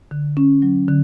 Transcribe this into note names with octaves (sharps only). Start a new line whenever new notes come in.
D3
C#4
F#3
D3